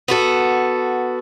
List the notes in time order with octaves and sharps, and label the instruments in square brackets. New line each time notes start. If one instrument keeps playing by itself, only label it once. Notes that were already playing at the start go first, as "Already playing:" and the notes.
[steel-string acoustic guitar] B3 F#4 A4